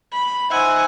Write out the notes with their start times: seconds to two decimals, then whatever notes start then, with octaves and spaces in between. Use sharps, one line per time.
0.12 B5
0.50 D#4 C5 E5 F#5 G#5 E6